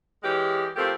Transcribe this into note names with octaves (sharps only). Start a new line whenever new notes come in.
E3 G#3 C#4 G4
F3 A3 A#3 C4 G4